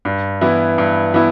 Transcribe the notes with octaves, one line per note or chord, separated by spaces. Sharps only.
G2
E3 B3 E4
G2
E3 B3 E4